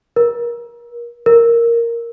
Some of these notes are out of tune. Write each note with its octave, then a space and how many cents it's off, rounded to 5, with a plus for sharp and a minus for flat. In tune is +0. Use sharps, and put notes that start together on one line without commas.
A#4 +30
A#4 +0